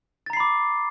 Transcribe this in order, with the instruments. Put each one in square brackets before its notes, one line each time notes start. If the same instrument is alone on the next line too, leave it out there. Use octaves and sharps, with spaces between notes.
[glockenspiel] A6
A#5
C7
B5
D6